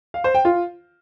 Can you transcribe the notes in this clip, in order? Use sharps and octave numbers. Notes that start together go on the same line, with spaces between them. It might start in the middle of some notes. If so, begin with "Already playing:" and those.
F5
C5
G5
F4